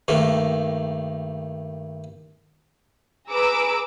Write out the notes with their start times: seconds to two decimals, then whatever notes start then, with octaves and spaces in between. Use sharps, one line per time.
0.08 G2 D#3 A3 A#3
3.29 G#4 B4 A#5 D6 E6 D7